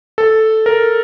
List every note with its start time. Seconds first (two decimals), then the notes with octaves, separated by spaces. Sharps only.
0.18 A4
0.66 A#4